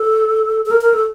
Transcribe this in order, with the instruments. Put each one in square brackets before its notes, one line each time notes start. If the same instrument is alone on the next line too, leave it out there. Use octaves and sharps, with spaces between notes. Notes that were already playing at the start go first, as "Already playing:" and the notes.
Already playing: [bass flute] A4
A4
A#4
A#4
A4